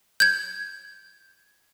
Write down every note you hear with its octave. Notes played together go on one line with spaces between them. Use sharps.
G6 G#6